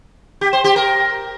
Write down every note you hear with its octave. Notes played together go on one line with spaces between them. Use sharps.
G4
C5
G4
A#4